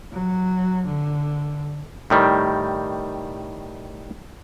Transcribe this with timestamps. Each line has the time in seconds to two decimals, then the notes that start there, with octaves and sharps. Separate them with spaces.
0.12 F#3
0.86 D3
2.10 A2 D#3 G3